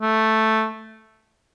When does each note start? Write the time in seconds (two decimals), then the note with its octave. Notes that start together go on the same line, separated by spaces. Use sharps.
0.01 A3